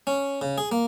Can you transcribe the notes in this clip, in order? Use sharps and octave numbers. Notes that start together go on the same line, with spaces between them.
C#4
C#3
G#4
A#3